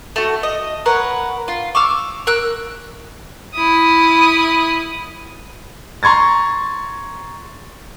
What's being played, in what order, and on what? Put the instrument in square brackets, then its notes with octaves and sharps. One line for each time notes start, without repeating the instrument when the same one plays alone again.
[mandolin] A3 F#4
D#5
A#4 B4 C#5 F#5
F4
C#6 D6 E6 F6
A#4 E6 F#6
[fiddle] E4 D#6
[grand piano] A#5 C6 C#6 G#6 A6